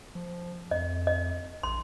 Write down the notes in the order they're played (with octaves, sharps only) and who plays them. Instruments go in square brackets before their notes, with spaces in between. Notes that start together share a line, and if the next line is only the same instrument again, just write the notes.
[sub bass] F3
[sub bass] F2 [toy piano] D#5
[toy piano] D#5
[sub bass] A#1 [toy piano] C6